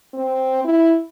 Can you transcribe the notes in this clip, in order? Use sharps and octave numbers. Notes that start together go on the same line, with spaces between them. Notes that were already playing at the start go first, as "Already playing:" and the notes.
C4
E4